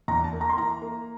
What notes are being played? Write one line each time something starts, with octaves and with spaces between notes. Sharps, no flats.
E2 A#5
A5
A#3
A#5
C6
E3 A#5
A#3